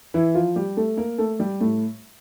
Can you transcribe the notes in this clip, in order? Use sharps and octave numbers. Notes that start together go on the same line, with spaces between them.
E3 E4
F3 F4
G3 G4
A3 A4
A#3 A#4
A3 A4
G3 G4
A2 A3